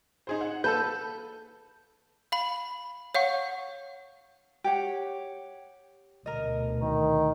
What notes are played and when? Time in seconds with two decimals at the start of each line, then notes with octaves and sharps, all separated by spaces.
0.27 D#4 G#4 C5
0.41 F#5
0.64 A#3 A4 B4 A5 E6 G6
2.32 F5 B5
3.15 C#5 F5 F#5 C#6
4.64 G4 C#5 F#5
6.26 D2 B2 A#4 D#5
6.82 D#3